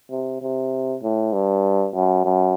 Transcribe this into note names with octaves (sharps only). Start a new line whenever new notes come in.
C3
C3
A2
G2
F#2
F#2